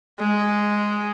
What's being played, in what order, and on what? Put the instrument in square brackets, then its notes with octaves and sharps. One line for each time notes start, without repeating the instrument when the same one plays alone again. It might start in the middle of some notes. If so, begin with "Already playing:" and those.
[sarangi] G#3